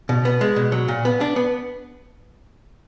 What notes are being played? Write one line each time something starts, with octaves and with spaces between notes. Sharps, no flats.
B2
B3
G#3
B2
F#3
A#2
B3
D4
B3